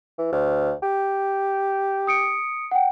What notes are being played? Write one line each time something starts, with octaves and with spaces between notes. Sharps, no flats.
E3
D2
G4
D#6 C#7 D7
F#5 G5